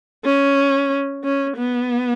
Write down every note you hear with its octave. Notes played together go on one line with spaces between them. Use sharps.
C#4
C#4
B3